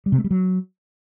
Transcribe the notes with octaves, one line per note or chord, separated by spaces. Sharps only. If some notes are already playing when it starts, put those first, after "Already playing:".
G3
C3
A3
G3
F#3